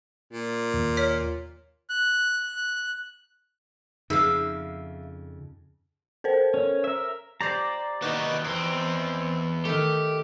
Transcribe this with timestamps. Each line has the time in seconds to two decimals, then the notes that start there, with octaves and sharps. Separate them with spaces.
0.32 A#2
0.74 D#2
0.97 C#5 F6 B6
1.90 F#6
4.10 F2 C#3 D#4 G#4 E5 F5
6.24 A4 A#4 C5
6.54 C#4
6.84 A#4 E5
7.41 G4 C5 D5 A#5
8.02 D#2 E3 D#4 F#4 B4 D#5
8.45 E2 C4
9.65 D#3 A3 G4